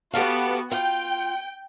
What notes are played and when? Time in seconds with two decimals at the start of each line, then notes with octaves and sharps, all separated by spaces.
0.13 B3 F#4 G4 A4 F5
0.71 F4 G5